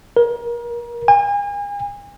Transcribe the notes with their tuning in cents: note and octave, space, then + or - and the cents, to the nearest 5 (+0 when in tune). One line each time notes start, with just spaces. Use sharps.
A#4 +30
G#5 -40